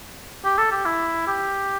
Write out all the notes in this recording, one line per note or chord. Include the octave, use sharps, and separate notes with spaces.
G4
A4
G4
E4
G4